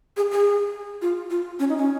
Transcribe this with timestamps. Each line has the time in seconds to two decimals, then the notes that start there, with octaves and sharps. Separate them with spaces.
0.17 G#4
0.31 G#4
1.02 F4
1.30 F4
1.59 C#4
1.69 D#4
1.78 C#4